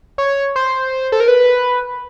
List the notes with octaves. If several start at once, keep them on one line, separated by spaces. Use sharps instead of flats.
C#5
C5
A4
A#4
B4